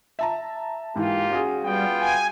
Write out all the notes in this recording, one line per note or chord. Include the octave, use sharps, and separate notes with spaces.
E5 A5 A#5
G#2 E3 A#3 F4 G4
C#4 F#4 G#4
G3 B3 F4 G5
G#5